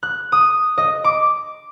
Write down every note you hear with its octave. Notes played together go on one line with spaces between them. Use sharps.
F#6
D#6
D#5
D6